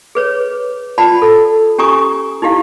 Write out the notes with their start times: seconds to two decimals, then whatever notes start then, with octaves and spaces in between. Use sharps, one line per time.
0.15 G#4 B4 C#5
0.98 F4 D5 F#5 A5 B5
1.22 A4
1.78 C#4 G4 G#5 A#5 C#6 D#6
2.42 D#4 E4 G4 F5